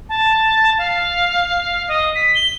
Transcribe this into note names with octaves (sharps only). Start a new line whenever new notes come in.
A5
F5
D#5
B6
G7